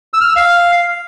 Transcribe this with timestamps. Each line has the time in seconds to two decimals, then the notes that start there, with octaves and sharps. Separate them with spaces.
0.14 E6
0.21 F6
0.29 E6
0.36 F5